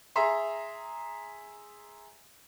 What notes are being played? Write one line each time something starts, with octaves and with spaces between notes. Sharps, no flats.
G#4 E5 A#5 C6